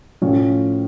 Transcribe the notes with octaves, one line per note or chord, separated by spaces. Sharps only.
A2 F3 A3 C#4